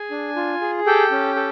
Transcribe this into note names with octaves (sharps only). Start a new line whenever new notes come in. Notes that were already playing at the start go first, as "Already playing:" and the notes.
Already playing: G#4 G#5
D4
F4
G#4
G4 A4 G5
C#4
A4